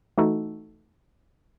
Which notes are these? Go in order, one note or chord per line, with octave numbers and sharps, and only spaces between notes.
E3 A3 D#4 F#4 A4